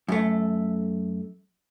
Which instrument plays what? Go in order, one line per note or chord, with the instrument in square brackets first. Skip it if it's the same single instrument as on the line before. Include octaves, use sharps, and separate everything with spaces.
[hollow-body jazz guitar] F#2 A3